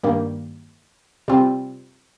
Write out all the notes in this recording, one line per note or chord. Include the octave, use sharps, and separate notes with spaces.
G2 D#3 G3 A#3
C3 G3 C4 F4